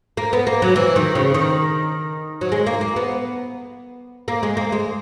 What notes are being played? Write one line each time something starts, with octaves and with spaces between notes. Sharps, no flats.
A#3
B3
A#3
F#3
E3
D#3
C#3
D#3
F#3
G#3
A#3
A#3
B3
A#3
G#3
A#3
G#3